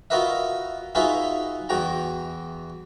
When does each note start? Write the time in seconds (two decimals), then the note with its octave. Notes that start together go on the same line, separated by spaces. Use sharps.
0.10 F4 F#4 A#4 B4 D#5 E5
0.95 D#4 F4 F#4 G#4 B4 E5
1.69 E2 F#4 G5 A#5